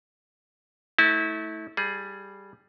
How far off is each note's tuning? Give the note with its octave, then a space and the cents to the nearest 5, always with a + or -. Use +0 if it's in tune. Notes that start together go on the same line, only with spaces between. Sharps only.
A3 +0 E4 -30
G3 +0 G#4 +20